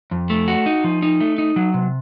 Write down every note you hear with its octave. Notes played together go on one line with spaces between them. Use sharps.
F2
A3
F#4
D#4
F3
D#4
A3
D#4
F#3
C3